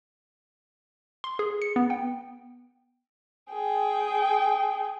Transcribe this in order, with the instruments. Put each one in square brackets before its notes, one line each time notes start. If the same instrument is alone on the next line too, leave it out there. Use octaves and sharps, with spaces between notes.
[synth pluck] C6
G#4
C#7
B3
G5
[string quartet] G#4 G5